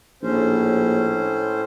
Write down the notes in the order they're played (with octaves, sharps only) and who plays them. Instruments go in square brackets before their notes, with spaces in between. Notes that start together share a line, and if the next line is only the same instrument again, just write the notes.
[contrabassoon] A#1 [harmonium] A2 C#4 C5